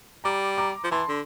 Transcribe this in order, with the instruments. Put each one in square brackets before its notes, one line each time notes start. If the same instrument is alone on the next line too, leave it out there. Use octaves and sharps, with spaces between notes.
[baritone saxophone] G3 [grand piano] A#5 D6
[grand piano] A#5 D6
[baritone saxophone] F3
[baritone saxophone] E3 [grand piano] A5 C6
[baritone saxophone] D3